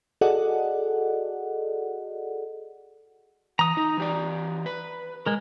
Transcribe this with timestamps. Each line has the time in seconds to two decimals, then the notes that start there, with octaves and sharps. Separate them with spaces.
0.21 F#4 G#4 A4 D5 D#5 F#5
3.59 E3 A#5 D#6
3.77 D#4
3.97 E3 G4 D5
4.66 B4
5.26 G#3 A#4